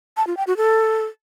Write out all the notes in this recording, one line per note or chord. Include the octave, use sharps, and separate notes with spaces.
A5
F4
G5
F#4
A4